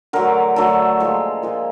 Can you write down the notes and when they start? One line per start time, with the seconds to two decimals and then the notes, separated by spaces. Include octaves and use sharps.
0.13 D3 F#3 A3 A#4
0.56 D3 F#3 A3 A4
1.00 A#2 F3 G#3
1.43 A#2 F3 G#3